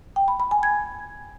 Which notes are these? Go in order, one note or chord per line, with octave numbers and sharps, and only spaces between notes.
G5
B5
B5
G#5
G#6